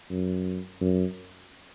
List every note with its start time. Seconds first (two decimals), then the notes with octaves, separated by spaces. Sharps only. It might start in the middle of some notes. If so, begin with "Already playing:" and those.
0.10 F#2
0.81 F#2